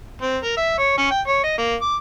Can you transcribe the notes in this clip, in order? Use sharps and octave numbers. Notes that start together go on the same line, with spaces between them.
C4
A#4
E5
C#5
C#4
G5
C#5
D#5
A#3
D6